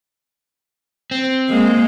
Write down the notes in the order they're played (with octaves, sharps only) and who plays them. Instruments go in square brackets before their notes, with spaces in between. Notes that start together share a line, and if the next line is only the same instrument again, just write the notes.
[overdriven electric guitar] C4
[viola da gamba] G#3 A#3